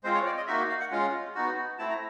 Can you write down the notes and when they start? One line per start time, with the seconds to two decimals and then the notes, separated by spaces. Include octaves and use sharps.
0.04 G#3 C4 F4 C5
0.14 C#5
0.26 D5
0.37 D#5
0.47 A#3 D#4 F#4 E5
0.69 F5
0.80 F#5
0.91 G#3 C#4 F4
1.35 B3 D#4 F#4
1.79 A3 C4 E4 A5
1.89 A#5